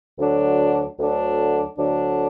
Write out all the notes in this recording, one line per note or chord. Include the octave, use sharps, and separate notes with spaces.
D2 D3 F#3 D4
D2 D3 F#3 D4
D2 D3 F#3 D4